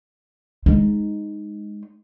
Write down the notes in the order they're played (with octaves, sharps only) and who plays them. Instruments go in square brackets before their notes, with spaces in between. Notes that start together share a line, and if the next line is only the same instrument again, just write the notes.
[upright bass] G#3 D#4